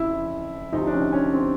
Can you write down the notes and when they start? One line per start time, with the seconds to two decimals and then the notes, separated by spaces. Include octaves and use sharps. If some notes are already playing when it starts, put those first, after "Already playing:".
Already playing: F2 C#3 E3 E4
0.72 D2 C3 F3 D#4
0.87 D4
0.92 C#4
1.12 C#4
1.33 C4